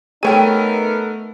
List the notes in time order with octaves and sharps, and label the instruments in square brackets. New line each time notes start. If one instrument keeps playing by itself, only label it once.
[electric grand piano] A3 D#7 [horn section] B3 D#4 A#4 [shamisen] G#4 C#5 G5